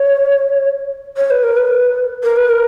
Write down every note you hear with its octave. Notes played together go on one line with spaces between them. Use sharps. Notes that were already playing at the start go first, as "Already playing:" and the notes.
Already playing: C#5
C#5
B4
A#4
B4
A#4
B4
A#4